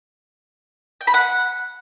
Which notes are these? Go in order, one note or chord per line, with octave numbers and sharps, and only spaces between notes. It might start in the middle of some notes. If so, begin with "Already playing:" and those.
G5
B5
F#5